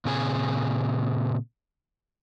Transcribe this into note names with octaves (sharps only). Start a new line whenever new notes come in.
A#2 C#3 C4 G#4 G#5